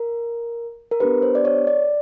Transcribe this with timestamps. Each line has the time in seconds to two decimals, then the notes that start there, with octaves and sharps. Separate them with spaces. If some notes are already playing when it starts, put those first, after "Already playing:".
Already playing: A#4
0.91 A#4
1.00 B3 D4 G4 B4
1.23 C5
1.35 D5
1.45 C#5
1.67 D5